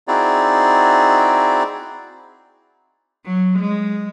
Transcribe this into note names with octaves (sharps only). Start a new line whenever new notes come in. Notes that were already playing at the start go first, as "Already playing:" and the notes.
C4 D#4 E4 F#4 G#4 D5
F#3
G#3